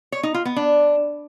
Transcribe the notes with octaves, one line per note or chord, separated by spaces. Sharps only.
C#5
D#4
F4
B3
D4